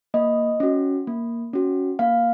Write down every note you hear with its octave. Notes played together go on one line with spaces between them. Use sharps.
A#3 D#5
C#4 F#4
A#3
C#4 F#4
A#3 F5